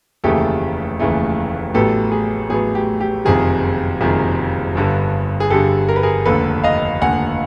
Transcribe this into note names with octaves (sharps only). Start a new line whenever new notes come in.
F1 D#2 C#3 E3 A3 G4 A4
F1 D#2 C#3 E3 A3
A1 A2 F#3 B3 G4 A4
G#4
A1 A2 F#3 B3 G#4
G4
G4
F#1 F2 C3 D#3 G3 G#4
F#1 F2 C3 D#3 G3 G#4
G1 G2 D3 G3
G#4
G1 G2 D3 G3 G4 A4
A#4
B4
G#4 A#4
F1 D#2 D3 A4 B4
D#5 F5
F1 D#2 D3 F#5 G#5